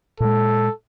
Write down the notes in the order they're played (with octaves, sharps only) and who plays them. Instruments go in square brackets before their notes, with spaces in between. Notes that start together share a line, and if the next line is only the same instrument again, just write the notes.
[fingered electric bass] A#2 G#3 [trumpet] A4